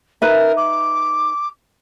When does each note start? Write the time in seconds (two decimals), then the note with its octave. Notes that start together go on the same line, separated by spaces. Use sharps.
0.22 D#4 A#4 B4 E5
0.57 D6